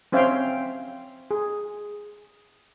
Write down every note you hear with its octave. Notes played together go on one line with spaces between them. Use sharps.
C4 C#4 C5 E5 F5 G5
G#4